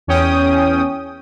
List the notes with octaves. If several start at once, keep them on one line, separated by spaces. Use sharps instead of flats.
E2 C#4 G5 D#6